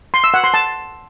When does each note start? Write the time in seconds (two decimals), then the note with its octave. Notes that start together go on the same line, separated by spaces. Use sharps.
0.14 C6
0.24 E6
0.34 F#5
0.44 C6
0.54 A5